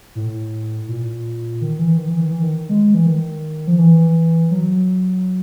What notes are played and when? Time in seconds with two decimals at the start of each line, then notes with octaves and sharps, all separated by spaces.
0.15 A2
0.88 A#2
1.61 D#3
1.79 E3
1.97 D#3
2.08 E3
2.20 D#3
2.31 E3
2.42 D#3
2.69 G#3
2.94 E3
3.06 D#3
3.67 F3
3.79 E3
4.51 F#3